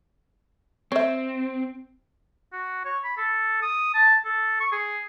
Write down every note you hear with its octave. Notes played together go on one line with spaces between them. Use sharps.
C4 C#5 E5
F#4
C#5
B5
A4
D#6
A5
A4
C#6
G#4